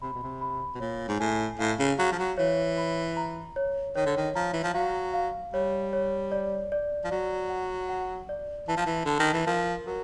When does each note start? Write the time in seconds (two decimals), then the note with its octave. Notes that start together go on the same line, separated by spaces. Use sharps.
0.02 C3 B5
0.13 B2
0.23 C3
0.41 B5
0.74 B2
0.80 A#2 C#5
1.08 G#2
1.20 A2 G#5
1.59 A2 F5
1.79 C#3
1.98 F#3 F5
2.12 F3
2.19 F#3
2.38 E3 C#5
2.77 B5
3.17 A#5
3.56 C#5
3.96 D#3 C#5
4.06 D3
4.17 D#3
4.35 F3 A#5
4.53 E3
4.64 F3
4.74 F#3 F5
5.14 F5
5.53 G3 C#5
5.93 C#5
6.32 D5
6.72 D5
7.04 F3
7.11 F#3 D5
7.50 F#5
7.89 F#5
8.29 D5
8.68 E3 A5
8.77 F3
8.86 E3
9.05 D3 A5
9.19 D#3
9.33 E3
9.47 F3 A#4
9.87 F#3 A#4